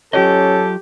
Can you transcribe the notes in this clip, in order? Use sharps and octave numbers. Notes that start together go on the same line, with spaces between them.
F#3 C#4 F4 G4 A4 D#5